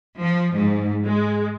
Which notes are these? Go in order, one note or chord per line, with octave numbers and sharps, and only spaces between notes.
F3
G#2
G#3